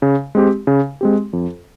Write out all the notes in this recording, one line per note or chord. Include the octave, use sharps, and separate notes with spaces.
C#3
G#3 C4 G4
C#3
G#3 C4 G4
F2